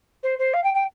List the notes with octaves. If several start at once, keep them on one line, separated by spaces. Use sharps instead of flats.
C5
C5
F5
G5
G5